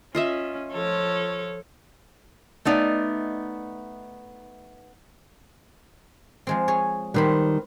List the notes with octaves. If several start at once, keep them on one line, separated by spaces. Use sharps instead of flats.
C#4 F4 D#5 E5
F3 A4 C#5
A3 B3 D#4 D5
F3 G#3 C4
G#4 C#5
D#3 G3 B4 C5 B5